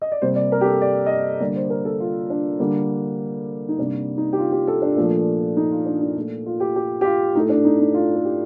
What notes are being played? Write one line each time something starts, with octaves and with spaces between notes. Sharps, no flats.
D#5
D5
C3 G3 A#3 C5
D5
A#4
G4
A4
D5
D#5
D5
D3 G3 A#3 D5
C5
A#4
A4
F4
D4
D3 G3 A#3
D#4
C3 G3 A#3 D4
D#4
G4
F4
G4
A4
D4
A#2 F3 A3
D#4
F4
D4
D#4
A#2 A3
F4
G4
G4
G4
F4
A2 A3 D#4
D4
D#4
D#4
F4
A4
G4